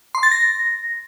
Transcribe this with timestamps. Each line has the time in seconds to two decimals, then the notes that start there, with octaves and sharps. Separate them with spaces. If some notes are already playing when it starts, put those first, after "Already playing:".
0.15 C6
0.23 A6
0.31 A#6